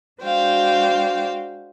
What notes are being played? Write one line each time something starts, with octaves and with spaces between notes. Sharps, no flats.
G#3 D4 F#4 C5 F5 G5